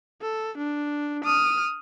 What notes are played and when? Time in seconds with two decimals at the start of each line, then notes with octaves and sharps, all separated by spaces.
0.22 A4
0.58 D4
1.24 D#6 F6